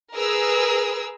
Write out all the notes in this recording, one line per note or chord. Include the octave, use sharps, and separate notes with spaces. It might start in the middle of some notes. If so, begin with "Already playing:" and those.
G#4 A#4 B4 E6